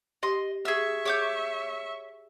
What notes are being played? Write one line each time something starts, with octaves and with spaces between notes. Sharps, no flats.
G4 D#5 C6
G#4 E5 C#6 E6
G#4 C#5 D6 G6